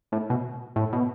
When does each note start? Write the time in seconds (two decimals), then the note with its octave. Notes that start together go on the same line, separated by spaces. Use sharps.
0.12 A2
0.30 B2
0.76 A2
0.93 B2